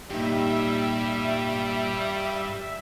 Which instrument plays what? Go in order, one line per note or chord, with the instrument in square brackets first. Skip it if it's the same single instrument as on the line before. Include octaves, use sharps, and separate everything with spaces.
[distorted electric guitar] G2 [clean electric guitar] A#2 D#4 G4 [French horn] G3 [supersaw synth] E5